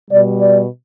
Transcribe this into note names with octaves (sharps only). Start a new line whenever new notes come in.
B2 G3 D5
D5